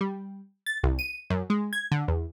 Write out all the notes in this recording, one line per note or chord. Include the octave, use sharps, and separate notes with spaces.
G3
A6
C2
D#7
F#2
G#3
G#6
D3
E2